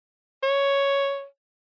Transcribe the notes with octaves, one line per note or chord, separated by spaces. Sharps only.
C#5